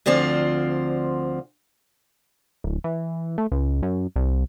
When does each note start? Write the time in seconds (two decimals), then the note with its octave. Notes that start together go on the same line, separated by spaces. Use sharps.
0.06 D2 D3 F3 C4 F4
2.64 D1
2.84 E3
3.38 A3
3.52 C#2
3.82 F#2
4.16 C2